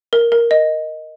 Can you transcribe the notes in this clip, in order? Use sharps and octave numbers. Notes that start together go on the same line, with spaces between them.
A#4
A#4
D#5